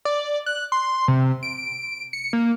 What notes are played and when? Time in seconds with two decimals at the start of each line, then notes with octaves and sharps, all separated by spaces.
0.05 D5
0.46 F#6
0.72 C6
1.08 C3
1.43 D7
2.13 C#7
2.33 A#3